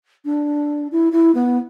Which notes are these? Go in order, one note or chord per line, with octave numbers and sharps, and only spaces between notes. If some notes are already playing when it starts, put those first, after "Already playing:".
D4
E4
E4
B3